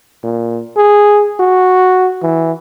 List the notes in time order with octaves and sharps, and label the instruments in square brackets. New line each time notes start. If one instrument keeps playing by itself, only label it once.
[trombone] A#2
G#4
F#4
E3